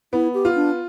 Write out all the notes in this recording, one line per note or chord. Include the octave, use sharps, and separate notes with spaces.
B3 E4
G4
F4
D4